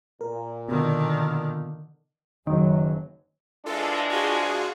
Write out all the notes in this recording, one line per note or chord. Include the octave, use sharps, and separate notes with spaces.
A#2 A#4
B2 D3 D#3
F#1 F#2 D#3 F#3
C3 E3 G#3 D4 F4 A4
F4 F#4 G#4